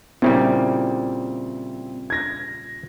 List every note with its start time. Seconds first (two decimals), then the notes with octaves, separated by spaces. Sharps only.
0.22 A#2 C#3 G3 C4 E4
2.10 G#6 A#6